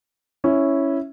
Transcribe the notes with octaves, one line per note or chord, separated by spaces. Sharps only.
C#4 E4